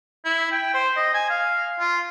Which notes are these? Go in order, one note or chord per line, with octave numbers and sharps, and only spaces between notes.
E4
G5
C5
D#5
G#5
F5
F4